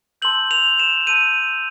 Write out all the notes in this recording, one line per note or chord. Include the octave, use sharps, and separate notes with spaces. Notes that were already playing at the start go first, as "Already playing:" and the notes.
A5 C6 E6 G6 F#7
F7
E7
A5 C6 E6 G6 D#7